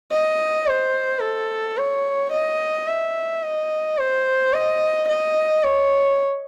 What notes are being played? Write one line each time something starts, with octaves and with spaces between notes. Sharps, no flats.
D#5
C5
A4
C#5
D#5
E5
D#5
C5
D#5
D#5
C#5